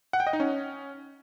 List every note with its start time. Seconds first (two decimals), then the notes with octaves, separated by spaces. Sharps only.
0.13 F#5
0.20 G5
0.27 D#5
0.33 D#4
0.40 C#4